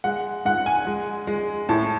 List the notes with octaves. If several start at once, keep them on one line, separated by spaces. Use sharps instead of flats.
G#3 F#5
G#2 F#5
G#5
G#3
G#3
A2 A5